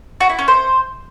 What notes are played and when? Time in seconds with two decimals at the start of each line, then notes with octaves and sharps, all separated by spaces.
0.20 F#4
0.30 E4
0.39 C#4
0.48 C5